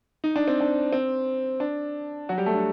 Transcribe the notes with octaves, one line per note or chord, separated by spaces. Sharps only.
D#4
D4
C4
D4
C4
D4
F#3 F#4
G3 G4
A3 A4
D4